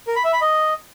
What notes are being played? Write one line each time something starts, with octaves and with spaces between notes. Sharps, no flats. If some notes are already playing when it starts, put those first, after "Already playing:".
A#4
B5
E5
B5
D#5